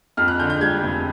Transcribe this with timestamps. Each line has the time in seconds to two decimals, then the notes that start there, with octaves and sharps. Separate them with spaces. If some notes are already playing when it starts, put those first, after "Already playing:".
0.17 F2 F6
0.28 F#6
0.39 D3 G6
0.50 G6
0.61 G3 G#6
0.83 F1